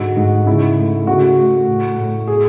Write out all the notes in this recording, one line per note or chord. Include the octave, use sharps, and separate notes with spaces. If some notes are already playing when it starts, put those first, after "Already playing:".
Already playing: G#2 D3 F#4
G#2
C#3 E4
A3
C#3 F#4
A3
A2
A2
G#4